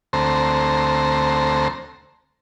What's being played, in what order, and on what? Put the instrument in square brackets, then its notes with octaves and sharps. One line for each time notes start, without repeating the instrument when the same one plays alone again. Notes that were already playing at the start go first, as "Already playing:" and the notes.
[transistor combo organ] D2 A3 C4 C5 A#5